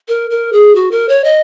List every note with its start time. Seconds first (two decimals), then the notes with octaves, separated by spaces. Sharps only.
0.08 A#4
0.30 A#4
0.53 G#4
0.75 F#4
0.91 A#4
1.09 C#5
1.24 D#5